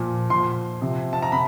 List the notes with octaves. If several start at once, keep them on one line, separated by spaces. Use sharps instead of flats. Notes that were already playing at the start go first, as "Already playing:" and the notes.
Already playing: A#2 F3
A#2 F3 C6
C3 F3
A5
A#5
C3 B5